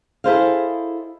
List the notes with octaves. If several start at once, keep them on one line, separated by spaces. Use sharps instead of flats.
E4 G#4 A4 C5 D#5 F5